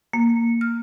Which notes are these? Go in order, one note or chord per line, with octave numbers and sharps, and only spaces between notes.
A#3
F6